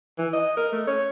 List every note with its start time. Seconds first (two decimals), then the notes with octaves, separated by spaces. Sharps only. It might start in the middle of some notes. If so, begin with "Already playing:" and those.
0.18 E3
0.33 D#5
0.57 A#4
0.72 A3
0.87 C#5